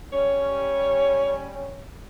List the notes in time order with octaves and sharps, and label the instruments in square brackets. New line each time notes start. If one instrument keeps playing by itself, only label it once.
[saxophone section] G3 C#4 [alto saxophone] C#5